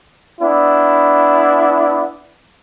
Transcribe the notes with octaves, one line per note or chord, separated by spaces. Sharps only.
B3 D4 E4